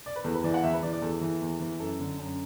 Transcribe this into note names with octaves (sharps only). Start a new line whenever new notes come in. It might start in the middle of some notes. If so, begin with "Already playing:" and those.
D5
B4
E2 A4
B4
E3 D5
F#5
E2 E5
B4
E3 D5
D5
E2 A4
E3
E2
E3
F#2 A4
D3
F#2